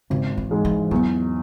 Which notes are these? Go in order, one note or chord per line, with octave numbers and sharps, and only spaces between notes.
G#1 C#3
E3
G#2 G#3
E3
E2 F#3